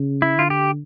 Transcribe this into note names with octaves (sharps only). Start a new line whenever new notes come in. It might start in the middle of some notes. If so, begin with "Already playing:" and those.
Already playing: C#3
E4
D3 F4
G4